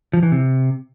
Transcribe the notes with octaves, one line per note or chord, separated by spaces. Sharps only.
F3
E3
C3